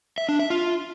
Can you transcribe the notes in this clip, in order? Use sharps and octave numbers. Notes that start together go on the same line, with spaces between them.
E5
D4
E5
F4